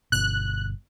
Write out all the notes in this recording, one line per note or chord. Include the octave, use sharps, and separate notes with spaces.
G1 B2 F#6